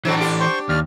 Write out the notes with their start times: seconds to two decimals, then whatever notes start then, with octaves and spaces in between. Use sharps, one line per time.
0.05 D3 E3 F#3 C4 A4
0.16 D4 G4
0.40 C5 C6 C#6
0.69 D#2 D5 F6